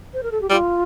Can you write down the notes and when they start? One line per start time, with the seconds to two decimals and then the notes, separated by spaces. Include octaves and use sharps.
0.13 C5
0.23 A#4
0.31 A4
0.41 G4
0.50 G3 F4